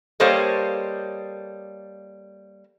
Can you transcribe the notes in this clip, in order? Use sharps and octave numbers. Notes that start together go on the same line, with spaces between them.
G3 A#3 A4 C5 C#5 D#5